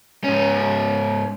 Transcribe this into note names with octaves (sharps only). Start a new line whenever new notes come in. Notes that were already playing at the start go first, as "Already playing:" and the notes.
G#2 C#4